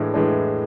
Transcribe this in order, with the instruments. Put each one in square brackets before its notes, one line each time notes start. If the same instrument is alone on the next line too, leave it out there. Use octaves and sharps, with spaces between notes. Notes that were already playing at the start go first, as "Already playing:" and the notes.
Already playing: [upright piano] A2 E3 G#3 D4
A2 E3 G#3 D4